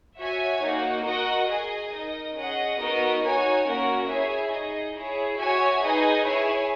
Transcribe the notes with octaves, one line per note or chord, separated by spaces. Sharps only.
F#4 C#5 E5 G#5
A#3 D#4 F#4
F#4 A#4 D#5 F#5
G#4 D#5 G#5
D#4 A#4 D#5
C#4 G#4 D#5 F#5
B3 D#4 F#4 A#4 D#5
D#4 F#4 C#5 G#5
A#3 C#4 F#4 A#4
E4 G#4 C#5 E5 G#5
D#4 G#4 D#5
E4 G#4 C#5
F#4 C#5 E5 G#5
D#4 G#4 B4 D#5 G#5
E4 G#4 C#5 G#5